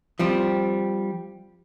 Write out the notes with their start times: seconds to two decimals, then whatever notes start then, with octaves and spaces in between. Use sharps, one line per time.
0.19 F3 G3 C4